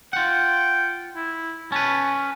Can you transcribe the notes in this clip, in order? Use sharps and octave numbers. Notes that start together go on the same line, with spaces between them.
F4 F#5 G5
E4
C#4 B4 A5